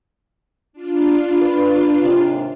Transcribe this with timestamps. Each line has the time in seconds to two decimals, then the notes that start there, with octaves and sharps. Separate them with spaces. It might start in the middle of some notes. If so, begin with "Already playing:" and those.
0.73 D4 F4
1.42 B4
2.02 D#2 G#2 C3